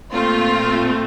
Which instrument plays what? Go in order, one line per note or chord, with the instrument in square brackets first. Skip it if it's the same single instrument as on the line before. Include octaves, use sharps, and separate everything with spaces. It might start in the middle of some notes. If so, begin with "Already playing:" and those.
[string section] A#2 A3 C4 F4